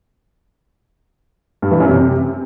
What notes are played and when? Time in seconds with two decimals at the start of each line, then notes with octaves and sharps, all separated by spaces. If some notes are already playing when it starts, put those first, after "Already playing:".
1.62 G2
1.71 E3
1.80 F#2
1.89 C3